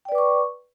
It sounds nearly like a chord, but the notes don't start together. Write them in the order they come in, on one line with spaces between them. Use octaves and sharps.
G5 D5 B4 D6 C#6